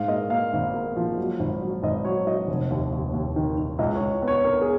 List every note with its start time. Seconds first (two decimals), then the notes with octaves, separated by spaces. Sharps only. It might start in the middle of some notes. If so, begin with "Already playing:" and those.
Already playing: G#2 F5
0.08 A#3 D#5
0.30 A#3 F5
0.53 G#1
0.74 A#3
0.97 F3
1.18 F#3
1.39 G#1
1.61 F#3
1.83 G#1 D#5
2.05 F#3 C#5
2.27 F#3 D#5
2.48 F1
2.70 D#2
2.93 D#2
3.13 D#2
3.36 D#3
3.57 D#3
3.79 C#2 D#5
3.95 C#2 C#5
4.22 B3
4.28 C#5
4.44 B3 A#4
4.62 G#4